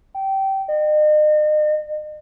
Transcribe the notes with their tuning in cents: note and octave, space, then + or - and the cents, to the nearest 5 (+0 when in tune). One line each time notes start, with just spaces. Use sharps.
G5 -20
D#5 -40